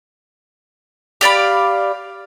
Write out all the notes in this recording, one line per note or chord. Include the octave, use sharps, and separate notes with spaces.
G4 D5 F5 B5